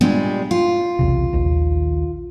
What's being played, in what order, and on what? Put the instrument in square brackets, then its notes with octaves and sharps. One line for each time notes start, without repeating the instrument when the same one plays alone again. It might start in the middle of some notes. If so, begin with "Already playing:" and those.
[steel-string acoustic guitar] A#2 G3 G#3 [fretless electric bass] B3 D4
[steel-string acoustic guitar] F4
[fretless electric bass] B1 E2 C3
A#1 D#2 D#3